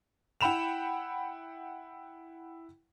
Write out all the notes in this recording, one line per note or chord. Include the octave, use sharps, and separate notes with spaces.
E4 F#5 G5 B5 E7 F7